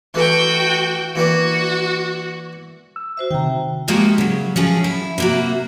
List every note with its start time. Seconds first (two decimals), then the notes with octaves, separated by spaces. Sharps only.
0.14 E3 A3 F#4 G5
1.16 E3 A#3 F#4 D5
2.96 E6
3.17 F#4 C5 E5
3.31 C3 D#3 G5 A#5
3.88 F3 G#3 A#3 B3 F#4 G4
4.18 C#3 F#3
4.56 F3 F#3 C#4 G#4
4.84 E4
5.18 C3 A#3 F#4